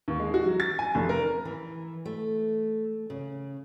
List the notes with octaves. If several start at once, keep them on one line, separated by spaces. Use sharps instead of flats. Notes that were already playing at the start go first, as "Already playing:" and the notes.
D#2
G#3
F#4
F#3
A6
G#5
F1
A#4
E3
A3
C#3